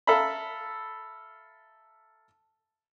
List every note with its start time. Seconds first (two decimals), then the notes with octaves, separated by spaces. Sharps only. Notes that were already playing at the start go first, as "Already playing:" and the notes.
0.07 A4 E5 F5 A#5 B5